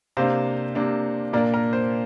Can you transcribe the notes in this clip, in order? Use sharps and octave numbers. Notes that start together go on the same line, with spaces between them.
C3 A#3 D4 C5 F5
C3 A#3 D4
A#2 A#3 D4 A#4 D5
A#4
C5